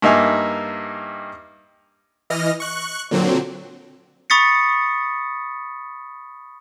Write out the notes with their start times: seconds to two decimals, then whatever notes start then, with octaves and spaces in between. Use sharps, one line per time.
0.02 G2 A#3 D#4 E5 G#5
2.30 E3 D#5 F6 A#6
2.60 C#6 F#6
3.11 A#2 D3 F#3 C4
4.30 B5 C#6 D#6 A6 B6 C#7